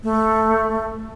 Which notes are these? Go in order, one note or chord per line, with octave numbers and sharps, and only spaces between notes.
A3